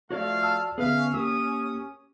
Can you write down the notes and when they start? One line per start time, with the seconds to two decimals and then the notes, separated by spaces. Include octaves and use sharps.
0.11 F3 A3 F#4 C#5 D5 F5
0.43 A5 E6 F6
0.78 D3 B3 C#4 G#4 B4 E5 F5
1.14 A#3 G4 D#6